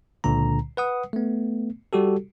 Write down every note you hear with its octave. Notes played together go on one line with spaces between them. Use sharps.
C#2 A#2 D3 A#5
B4 F#5 D#6
A3 B3
G3 F#4 G4 A4